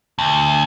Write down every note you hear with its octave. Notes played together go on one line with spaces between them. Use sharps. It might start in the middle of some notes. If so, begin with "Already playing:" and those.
D2